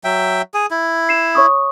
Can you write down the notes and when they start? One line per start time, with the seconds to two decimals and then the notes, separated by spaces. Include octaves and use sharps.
0.04 F#3 E5 G5
0.54 G#4
0.71 E4
1.09 C7 E7
1.35 C#5 C#6 D#6